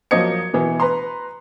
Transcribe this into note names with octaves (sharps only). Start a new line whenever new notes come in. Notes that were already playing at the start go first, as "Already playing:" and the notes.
F3 F#3 A#3 D#5 G#6 C#7
B2 E3
B4 A#5 C6